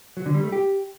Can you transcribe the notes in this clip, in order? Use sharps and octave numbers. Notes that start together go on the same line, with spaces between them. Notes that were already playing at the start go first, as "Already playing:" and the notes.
F#3
D3
G3
A3
G4